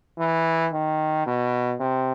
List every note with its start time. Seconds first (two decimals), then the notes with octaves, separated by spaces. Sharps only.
0.18 E3
0.73 D#3
1.26 B2
1.80 C3